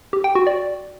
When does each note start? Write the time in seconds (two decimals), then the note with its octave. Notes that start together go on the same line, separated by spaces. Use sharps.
0.13 G4
0.24 G5
0.35 F#4
0.47 D5